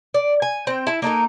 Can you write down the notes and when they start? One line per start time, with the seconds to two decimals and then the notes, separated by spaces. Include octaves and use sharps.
0.14 D5
0.42 G#5
0.67 C4 G5
0.87 E4 A5
1.02 A#3 D#4 A4 A#4